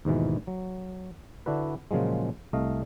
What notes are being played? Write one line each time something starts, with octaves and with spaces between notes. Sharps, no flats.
D#2 G#2 B2 E3
F#3
D3 D4 E4 F#4 B4
A#2 C#3 F3 F#3 G#3
C2 A3 D#5 F5